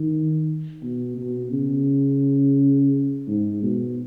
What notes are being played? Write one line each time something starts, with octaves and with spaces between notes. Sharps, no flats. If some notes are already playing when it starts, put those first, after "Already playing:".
Already playing: D#3
B2
B2
C#3
G#2
B2